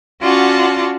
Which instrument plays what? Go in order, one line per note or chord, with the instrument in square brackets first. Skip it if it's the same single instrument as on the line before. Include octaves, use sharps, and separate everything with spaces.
[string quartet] C#4 F4 F#4 D5 F#5 A5